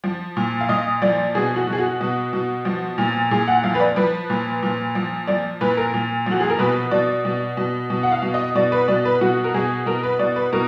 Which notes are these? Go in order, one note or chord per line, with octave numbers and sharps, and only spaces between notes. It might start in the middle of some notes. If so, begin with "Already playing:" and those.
F3
A#2
F5
A#2 D#5
F3 D5
B2 G#4
F#4
B2
G#4
F#4
B2
B2
F3
A#2
A#2 G#4
F#5
F3 F5
B4
D5
F3 B4
A#2
A#2
F3
F3 D5
A#2 B4
A#4
A#2
F3 F#4
G#4
A#4
B2 B4
B2 D5
B2
B2
B2
F#5
F5
B2
D#5
B2 D5
B4
B2 D5
B4
B2 F#4
A#4
B2 G#4
B2 A#4
B4
B2 D5
B4
B2 A#4